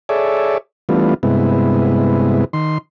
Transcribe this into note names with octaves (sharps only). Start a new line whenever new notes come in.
G#4 A4 C#5 D5 E5
E3 G3 A3 B3 D4 F4
G2 C3 G#3 B3 E4
D#3 C6